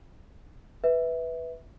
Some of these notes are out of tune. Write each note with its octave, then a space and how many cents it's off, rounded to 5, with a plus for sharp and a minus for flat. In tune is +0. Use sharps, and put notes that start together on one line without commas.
B4 +0 E5 -15